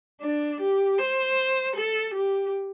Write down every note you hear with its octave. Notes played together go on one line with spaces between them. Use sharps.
D4
G4
C5
A4
G4